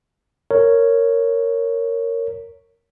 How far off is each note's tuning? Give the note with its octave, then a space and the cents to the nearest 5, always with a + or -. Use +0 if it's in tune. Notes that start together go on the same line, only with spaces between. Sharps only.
A#4 -10 C#5 +0